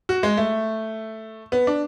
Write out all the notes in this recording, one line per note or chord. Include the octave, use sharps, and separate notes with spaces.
F#4
G#3
A3
B3
D4